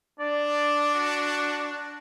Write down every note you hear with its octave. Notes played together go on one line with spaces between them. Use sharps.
D4 D5
F#4